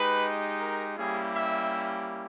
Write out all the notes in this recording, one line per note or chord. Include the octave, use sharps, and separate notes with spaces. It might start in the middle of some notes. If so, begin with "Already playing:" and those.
Already playing: G#3 D#4 G4 B4
A#4
G3 A#3 C#4 E4 G4 G#4
E5